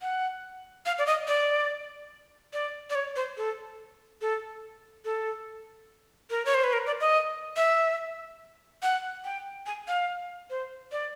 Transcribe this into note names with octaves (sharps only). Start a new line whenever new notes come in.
F#5
F5
D5
D#5
D5
D5
D5
C#5
C5
A4
A4
A4
A#4
C#5
C5
B4
A#4
D5
D#5
E5
F#5
G5
G#5
F5
C5
D5